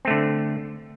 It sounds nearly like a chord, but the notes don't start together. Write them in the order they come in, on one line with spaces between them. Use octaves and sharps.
C4 A3 D3